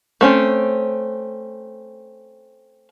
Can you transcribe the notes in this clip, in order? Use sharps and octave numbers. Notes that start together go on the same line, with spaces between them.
A3 C4 C#4